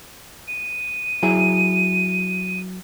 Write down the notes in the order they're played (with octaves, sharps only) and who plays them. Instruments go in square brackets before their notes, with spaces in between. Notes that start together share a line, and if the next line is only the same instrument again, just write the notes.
[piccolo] D#7
[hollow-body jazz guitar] F#3 E4 G#4